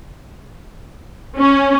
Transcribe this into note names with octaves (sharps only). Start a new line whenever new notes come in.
C#4